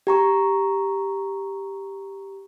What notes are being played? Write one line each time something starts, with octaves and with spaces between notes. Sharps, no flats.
G4 A#5 C#6